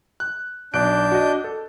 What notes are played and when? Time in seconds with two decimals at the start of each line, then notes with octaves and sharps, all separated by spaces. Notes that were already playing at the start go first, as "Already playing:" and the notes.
0.20 F#6
0.74 B1 D4 F#6 G6 D7
1.12 F#4 D#5
1.44 A4